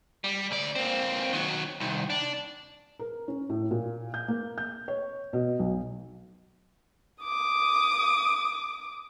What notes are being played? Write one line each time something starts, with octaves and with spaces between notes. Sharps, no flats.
G3
D2 D5
A#3 C4
D#3 F#3
C2 D#3
D4
A#4
C#4
A2
A#2
G6
A#3
G6
C#5
B2
B1
D6 D#6